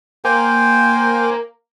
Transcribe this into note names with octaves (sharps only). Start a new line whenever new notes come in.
A#3 C5 G5 G#5